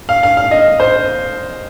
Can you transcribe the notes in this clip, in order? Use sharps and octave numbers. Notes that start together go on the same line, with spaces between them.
F5
F5
F5
D#5
C5